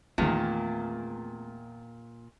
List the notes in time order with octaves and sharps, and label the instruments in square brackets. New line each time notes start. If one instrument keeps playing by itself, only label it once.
[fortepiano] E2 D#3 [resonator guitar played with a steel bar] A#2 [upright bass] A3 C4